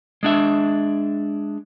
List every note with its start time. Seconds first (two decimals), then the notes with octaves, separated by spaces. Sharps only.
0.23 G#3 D4 E5